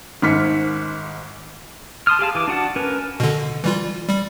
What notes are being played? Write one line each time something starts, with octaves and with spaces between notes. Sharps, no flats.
G#1 G#2 F6 B6 C#7
A5 C6 D#6 F6
G4 G#4 F5 A5
E3 D6
D4 F#4 F#5 A5
C#4 A#4 B4
B2 D3
E3 G3 F4
G3